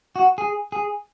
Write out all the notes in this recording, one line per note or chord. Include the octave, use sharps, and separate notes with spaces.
F#4
G#4
G#4